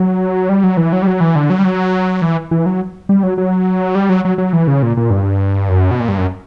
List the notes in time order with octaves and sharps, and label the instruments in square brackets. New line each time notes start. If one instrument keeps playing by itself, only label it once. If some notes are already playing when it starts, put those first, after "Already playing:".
Already playing: [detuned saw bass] F#3
G3
F#3
E3
F#3
G3
F#3
E3
D3
F#3
G3
F#3
E3
E3
F#3
G3
F#3
F#3
G3
F#3
F#3
F#3
E3
C#3
A#2
A#2
G2
F#2
B2
A#2
G2
F#2